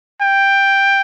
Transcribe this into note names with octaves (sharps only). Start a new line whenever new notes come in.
G5